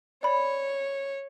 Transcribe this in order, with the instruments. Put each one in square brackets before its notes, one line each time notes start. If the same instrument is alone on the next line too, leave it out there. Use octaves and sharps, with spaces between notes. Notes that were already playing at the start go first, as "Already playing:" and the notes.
[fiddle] C#5 [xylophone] D5 B5